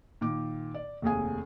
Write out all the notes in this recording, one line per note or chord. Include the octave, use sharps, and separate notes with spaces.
A#2 D#3 D6
D5
F1 D#2 G#4 G#5